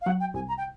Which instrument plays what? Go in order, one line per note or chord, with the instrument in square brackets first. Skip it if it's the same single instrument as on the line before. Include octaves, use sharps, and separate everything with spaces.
[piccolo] F5
[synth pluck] F#3 [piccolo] F#5
[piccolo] G5
[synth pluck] C2 [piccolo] G#5
[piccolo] A#5
G5